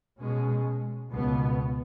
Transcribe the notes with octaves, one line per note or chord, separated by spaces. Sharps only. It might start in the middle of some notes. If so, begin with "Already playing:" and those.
B2 G#3 C#4
C#2 B2 B3